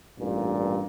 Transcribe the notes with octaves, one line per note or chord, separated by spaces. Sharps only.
A1 G2 A#2